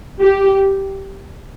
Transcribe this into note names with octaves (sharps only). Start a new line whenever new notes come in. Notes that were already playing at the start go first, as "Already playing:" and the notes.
G4